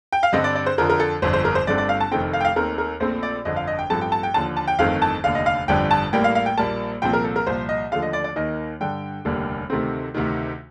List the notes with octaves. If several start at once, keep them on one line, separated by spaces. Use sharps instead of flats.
G5
F5
G2 D3 G3 C4 D#5
D5
D5
C5
F2 D3 F3 A#4
A#4
A4
G1 F2 D3 C5
C5
A#4
C5
G1 G2 D3 A3 C4 D5
D5
F5
A5
F1 F2 D#3 A3 C4 G5
F5
G5
F5
D#2 D#3 A3 C4 A#4
A#4
A#1 A#2 A3 C4 C5
D5
G1 F2 D3 D#5
F5
D#5
G5
A1 G2 F3 A3 C4 A5
G5
A5
G5
D#2 D3 F3 A5
A5
G5
G1 F2 D#3 A3 C4 F5
A5
F1 D#2 D3 F5
D#5
F5
G1 F2 D3 G3 G5
A5
A1 A2 G3 A#3 G5
F5
F5
G5
A#1 A#2 G3 A#3 A5
C2 A#2 F3 C4 G5
A#4
A4
A#4
C2 A#2 F3 C5
D#5
D#2 D3 F3 A3 F5
D#5
D5
D5
D#2 D#3 A#3 D#5
G2 D3 G3 G5
F1 D#2 D3 G3 A#3
D2 C3 D#3 A3 C4
D2 C3 D#3